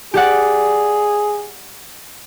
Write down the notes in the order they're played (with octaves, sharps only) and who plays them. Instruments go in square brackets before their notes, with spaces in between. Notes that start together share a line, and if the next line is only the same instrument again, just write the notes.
[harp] G4 D5 F#5 [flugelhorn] G#4